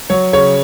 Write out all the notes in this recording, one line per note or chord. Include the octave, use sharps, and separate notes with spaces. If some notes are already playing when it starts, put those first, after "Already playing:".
F#3 C#5
C#3 C#5